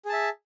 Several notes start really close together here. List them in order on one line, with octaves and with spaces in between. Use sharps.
G#4 A5 E5